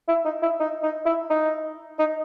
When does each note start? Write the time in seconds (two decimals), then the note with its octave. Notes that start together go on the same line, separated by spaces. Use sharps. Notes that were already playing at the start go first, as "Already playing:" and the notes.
0.08 E4
0.25 D#4
0.42 E4
0.60 D#4
0.83 D#4
1.06 E4
1.30 D#4
1.99 D#4